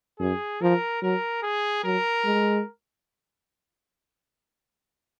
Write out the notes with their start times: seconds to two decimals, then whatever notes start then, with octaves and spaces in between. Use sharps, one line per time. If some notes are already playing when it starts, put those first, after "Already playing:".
0.20 F#2 G#4
0.62 F3 A#4
1.02 F#3 A#4
1.43 G#4
1.84 F#3 A#4
2.25 G#3